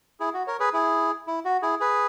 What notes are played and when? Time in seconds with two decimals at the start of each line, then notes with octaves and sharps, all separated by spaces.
0.20 E4 G#4
0.34 F#4
0.47 A#4 C#5
0.60 G#4 B4
0.73 E4 G#4
1.27 E4
1.45 F#4
1.62 E4 G#4
1.80 G#4 B4